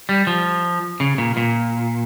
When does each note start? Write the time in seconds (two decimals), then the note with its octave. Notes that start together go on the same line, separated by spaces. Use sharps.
0.09 G3
0.27 F3
1.00 C#3
1.18 A#2
1.37 A#2